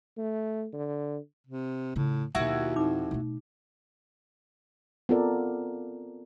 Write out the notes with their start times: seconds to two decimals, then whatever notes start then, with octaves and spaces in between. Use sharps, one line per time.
0.17 A3
0.73 D3
1.47 C3
1.96 A2 C#3 F4
2.35 D#2 B2 F#3 E4 F#4 F#5
2.76 F2 D#4 D6
3.11 B2 A3
5.09 B3 C4 F4 A4 A#4 D5